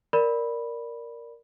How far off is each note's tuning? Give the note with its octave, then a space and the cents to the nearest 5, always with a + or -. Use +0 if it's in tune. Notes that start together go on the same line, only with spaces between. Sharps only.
A#4 +0 D5 +0 B5 -5